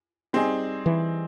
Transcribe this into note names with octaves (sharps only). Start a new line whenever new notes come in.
G3 C4 D#4 G#4
E3